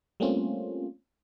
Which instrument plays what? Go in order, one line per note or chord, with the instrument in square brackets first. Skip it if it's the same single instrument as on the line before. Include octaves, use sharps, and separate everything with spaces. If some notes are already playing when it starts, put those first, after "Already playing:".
[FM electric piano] G3 A3 A#3 C4 C#4 F4